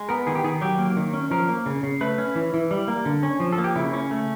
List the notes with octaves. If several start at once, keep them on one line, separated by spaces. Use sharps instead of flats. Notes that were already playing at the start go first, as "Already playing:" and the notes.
Already playing: G#3
B3 A#4
D#3 G#4
G4
D#3 G#4
F#3 G4
A#3
D#3
C#4
F3 A#4
A#3
C#3
C#3
A3 B4
C#4
E3
E3
G3
A#3
D3
C#4
F3
A4
A#3
G4
C#3 E4
C#4
A3